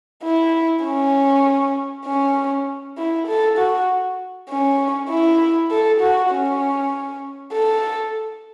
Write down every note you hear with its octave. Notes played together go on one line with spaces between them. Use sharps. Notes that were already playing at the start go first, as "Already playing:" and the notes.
E4
C#4
C#4
E4
A4
F#4
C#4
E4
A4
F#4
C#4
A4